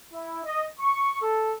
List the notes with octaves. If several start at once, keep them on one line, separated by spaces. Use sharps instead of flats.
E4
D#5
C#6
A4